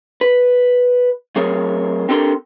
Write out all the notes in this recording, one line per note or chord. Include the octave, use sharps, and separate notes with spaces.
B4
F#3 A3 C4 G#4 A#4 C#5
C4 D4 G4 A4 A#4 C6